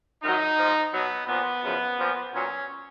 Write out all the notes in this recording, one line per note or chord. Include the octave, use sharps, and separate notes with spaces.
F#2 D#3 F#3 D#4
G#2 F3
B2 F#3 B3
A#2 F3 B3
F#2 C#3 F3
A#2 F3
A#2 F#3 C#4